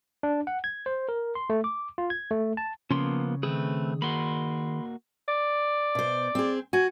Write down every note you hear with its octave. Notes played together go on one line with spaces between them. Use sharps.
D4
F#5
G#6
C5
A#4
C6
A3
D6
F4
G#6
A3
A5
C#3 F3 A#3 B3 C#4 C6
D#3 A3 C4 G#4 B4
A#3 F#4 B5 C6
D5
B2 C5
C4 G#4
F#4 G#5